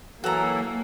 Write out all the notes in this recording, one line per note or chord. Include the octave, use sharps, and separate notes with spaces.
E3 F#3 A#3 F#4 A4 A#5